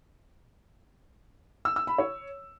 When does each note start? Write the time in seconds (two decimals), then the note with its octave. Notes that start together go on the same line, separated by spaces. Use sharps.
1.65 E6
1.76 E6
1.87 B5
1.98 C#5